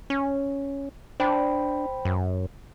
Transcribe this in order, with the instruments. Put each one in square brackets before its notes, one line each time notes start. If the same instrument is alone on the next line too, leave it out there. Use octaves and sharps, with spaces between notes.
[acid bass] C#4
[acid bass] D4 [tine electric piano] C5 G5 B5
[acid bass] F#2